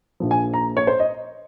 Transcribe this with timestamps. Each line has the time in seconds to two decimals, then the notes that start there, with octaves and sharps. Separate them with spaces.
0.20 A#1 A#2 F3
0.31 G#5
0.54 A#5
0.77 C#5
0.87 C5
1.00 D#5